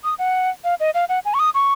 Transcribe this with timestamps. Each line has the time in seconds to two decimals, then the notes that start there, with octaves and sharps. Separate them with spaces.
0.04 D#6
0.19 F#5
0.64 F5
0.80 D#5
0.94 F5
1.09 F#5
1.25 G#5
1.34 C#6
1.39 D#6
1.54 C#6